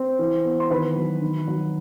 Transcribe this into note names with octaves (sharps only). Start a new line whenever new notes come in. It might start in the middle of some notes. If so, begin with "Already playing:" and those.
Already playing: C4
E3
B3
C6
D#3 B4 B5
F#3
D#3
F#3